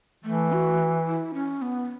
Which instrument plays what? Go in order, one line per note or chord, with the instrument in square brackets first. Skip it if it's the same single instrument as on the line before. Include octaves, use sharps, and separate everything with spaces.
[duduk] E3 [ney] A3
[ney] F#4
E4
C#4
B3